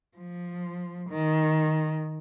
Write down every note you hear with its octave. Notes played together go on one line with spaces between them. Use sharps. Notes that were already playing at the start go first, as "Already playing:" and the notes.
F3
D#3